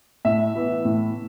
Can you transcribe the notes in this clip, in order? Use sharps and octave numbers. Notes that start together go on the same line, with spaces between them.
A2 E5
E3 B3
A2